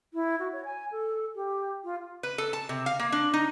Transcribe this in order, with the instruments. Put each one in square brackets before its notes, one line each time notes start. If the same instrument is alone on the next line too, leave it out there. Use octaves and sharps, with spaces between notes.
[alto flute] E4
F#4
C#5
G#5
A4
G4
F4
[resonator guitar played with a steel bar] B4
A4
A5
C3
F5
A#3
D4
D#4